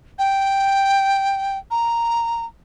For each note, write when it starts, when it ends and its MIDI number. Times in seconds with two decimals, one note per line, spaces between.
0.19 1.58 79
1.71 2.45 82